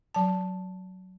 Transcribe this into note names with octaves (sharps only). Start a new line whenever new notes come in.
F#3 A5